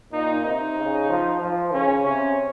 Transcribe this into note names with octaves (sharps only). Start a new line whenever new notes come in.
A#2 D#4
C3 D#4
C#3
F3
F3
C#3 C#4
C3 C#4